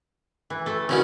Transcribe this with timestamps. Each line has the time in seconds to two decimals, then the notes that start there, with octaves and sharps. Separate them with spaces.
0.50 E3
0.66 A3 A4
0.89 C2 B2 D#3 C#4 E4